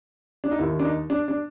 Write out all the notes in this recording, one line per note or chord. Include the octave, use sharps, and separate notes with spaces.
D4
D#4
D#2 D#3 E4
D4
D#4
D4
D4